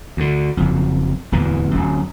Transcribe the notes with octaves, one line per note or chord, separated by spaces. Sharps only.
D2 D3
F#1 F2
D1 E2 E3
D1 F#2